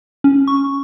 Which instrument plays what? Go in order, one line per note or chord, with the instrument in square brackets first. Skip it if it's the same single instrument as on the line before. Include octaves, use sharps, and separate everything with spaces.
[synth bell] C#4
C#6